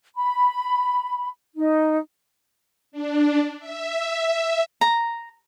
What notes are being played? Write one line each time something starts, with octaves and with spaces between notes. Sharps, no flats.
B5
D#4
D4
E5
A#5